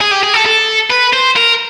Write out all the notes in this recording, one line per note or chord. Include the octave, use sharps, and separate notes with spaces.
G#4
G4
G#4
A4
A4
B4
C5
A#4